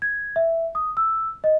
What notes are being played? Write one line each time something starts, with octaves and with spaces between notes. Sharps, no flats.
G#6
E5
D#6
E6
D#5